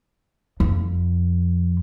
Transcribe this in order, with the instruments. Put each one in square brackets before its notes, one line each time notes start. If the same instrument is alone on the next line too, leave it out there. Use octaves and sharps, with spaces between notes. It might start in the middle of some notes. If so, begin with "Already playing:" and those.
[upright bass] F2